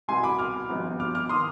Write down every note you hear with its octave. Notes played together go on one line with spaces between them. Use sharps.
C2 B2 B3 G#5 C6
B5 D6
D6 F6
G#1 G2 F3 B3
D6 F6
D6 F6
D#3 C6 D#6